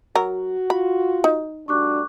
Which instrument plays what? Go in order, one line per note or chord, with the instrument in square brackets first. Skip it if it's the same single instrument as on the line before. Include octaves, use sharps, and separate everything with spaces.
[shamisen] F#3 A#4 [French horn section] F#4
[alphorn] F4 [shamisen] B5
[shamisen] D#4
[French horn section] G3 A3 F#4 [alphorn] D4 [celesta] C#6 D6 F#6